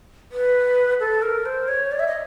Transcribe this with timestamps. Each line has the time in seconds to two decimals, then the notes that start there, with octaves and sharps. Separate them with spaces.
0.32 B4
1.00 A4
1.22 A#4
1.45 C5
1.68 C#5
1.92 D5
1.99 E5
2.07 D#5